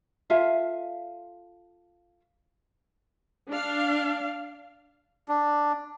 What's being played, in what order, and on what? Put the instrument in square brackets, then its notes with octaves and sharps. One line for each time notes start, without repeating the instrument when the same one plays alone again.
[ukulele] F4 A4 E5 F5
[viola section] D4 F5
[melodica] D4